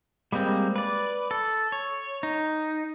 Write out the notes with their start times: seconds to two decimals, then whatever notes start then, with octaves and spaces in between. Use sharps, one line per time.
0.32 G3 G#3 A#3 C4
0.76 B4 D5
1.31 A4
1.72 C#5
2.23 D#4